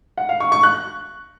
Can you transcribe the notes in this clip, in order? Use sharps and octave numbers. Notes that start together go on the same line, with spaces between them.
F#5
F5
C#6
C#6
F#6